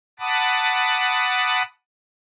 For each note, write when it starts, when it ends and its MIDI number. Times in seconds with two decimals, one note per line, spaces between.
0.20 1.62 78
0.20 1.62 81
0.20 1.62 83
0.20 1.62 86
0.20 1.62 87